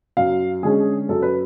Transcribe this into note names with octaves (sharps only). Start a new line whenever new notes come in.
F#2 F5
D3 G#3 C#4 G#4
F#2 A4
B4